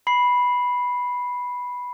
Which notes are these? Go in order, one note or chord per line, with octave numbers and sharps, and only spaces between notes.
B5 C7